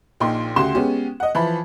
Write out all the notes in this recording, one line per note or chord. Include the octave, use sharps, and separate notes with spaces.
A#1 A#2 D#4 G5 C6
D2 C#3 F#4 G4 C6 E7
G#3 B3 C#4 G4
D#5 F#5
E3 F3 B5